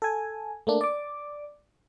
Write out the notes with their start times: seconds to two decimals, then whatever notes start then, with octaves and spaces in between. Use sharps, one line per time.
0.02 A4 G#5
0.67 A3 A#3 D4
0.81 D5 D6